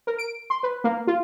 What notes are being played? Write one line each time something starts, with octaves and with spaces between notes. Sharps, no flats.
A#4
D7
C6
B4
A#3
F4